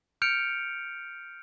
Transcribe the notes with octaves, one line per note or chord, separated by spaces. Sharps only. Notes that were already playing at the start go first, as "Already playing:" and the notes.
F6 G6 C#7 D7 F7